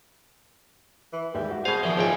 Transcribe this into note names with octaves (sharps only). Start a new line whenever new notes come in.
E3
D#2 G3 G#3 E5
F#4
B2 G#4 C5 F5 G#6
E3 F3 A#3 G#4 C5 D5 E5
G#1 C#2 F3 C5 F5 G5 G#5